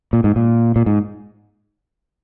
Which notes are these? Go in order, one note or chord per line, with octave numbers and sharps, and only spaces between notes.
A#2
G#2
A#2
A#2
G#2